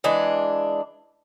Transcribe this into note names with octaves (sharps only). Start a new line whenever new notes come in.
E3 G#3 D4